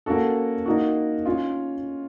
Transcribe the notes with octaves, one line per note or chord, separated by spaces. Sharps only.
A#3 C#4 F#4 A4
A#3 D#4 F#4
C#4 F4